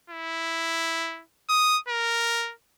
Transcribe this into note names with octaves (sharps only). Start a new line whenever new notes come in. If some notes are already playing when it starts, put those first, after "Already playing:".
E4
D#6
A#4